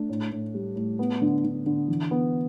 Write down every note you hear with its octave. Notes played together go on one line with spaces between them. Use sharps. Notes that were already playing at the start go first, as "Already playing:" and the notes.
Already playing: A3 D4
A2
A2
G3
A2
B3
D3
D3
D3
E3
B3